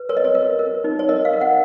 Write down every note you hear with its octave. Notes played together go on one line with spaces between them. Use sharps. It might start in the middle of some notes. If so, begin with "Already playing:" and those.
Already playing: B4
A#4 C#5
D#5
C#5
A#4
A#4
D#4
C#5
A#4 D#5
F5
A#4
F#5